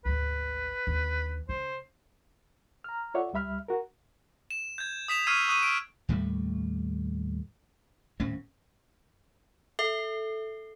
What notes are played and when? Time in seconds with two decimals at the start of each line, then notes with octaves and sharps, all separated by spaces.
0.05 G#1 D2 B4
0.87 D#2 D3
1.49 C#3 C5
2.84 A#5 F6
3.14 F4 A4 C#5 D5 E5 F#5
3.33 C#2 G3 E5 B5 F6
3.68 F#4 A#4
4.51 E7
4.78 G6 G#6
5.08 D#6 B6 E7 F7
5.27 C#6 E6 F6 G#6 C7 D#7
5.48 C#6 D#6 F#6 D#7
5.63 E6 D7
6.09 D#2 A2 G3 A3
8.20 D#1 A2 C4 C#4
9.79 A4 E5